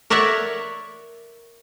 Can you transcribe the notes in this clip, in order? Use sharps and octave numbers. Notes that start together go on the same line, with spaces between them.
A#4 C#5 D5 E5 F#5